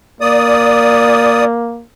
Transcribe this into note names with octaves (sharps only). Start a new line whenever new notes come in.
A#3 D5 D#6